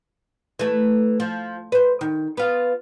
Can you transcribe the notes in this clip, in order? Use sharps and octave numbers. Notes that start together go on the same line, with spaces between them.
E3 A3
F3
B4 C5
D#3
B3 F4